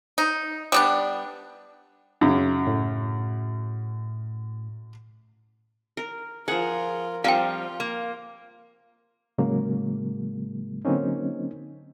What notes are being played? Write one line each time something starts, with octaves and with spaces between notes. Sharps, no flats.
D#4
G3 B3 D4
F#2 C#3
A2
A#4
F3 F4 G#4 A#4 F#5
F3 G3 C4 F4 A#4 F5 G5
A#3
A2 C#3 F#3 G#3 A#3
D3 F#3 A#3 C4 C#4 D#4